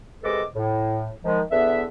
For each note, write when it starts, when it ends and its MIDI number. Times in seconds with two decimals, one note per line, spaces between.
0.23 0.42 48
0.23 0.42 56
0.23 0.42 69
0.23 0.42 71
0.23 0.42 75
0.23 0.42 86
0.54 1.08 45
1.23 1.41 51
1.23 1.41 53
1.23 1.41 56
1.51 1.84 40
1.51 1.84 50
1.51 1.84 59
1.51 1.84 71
1.51 1.84 76